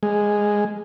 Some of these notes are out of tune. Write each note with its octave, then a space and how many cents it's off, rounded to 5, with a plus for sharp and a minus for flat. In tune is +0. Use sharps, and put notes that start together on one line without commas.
G#3 -5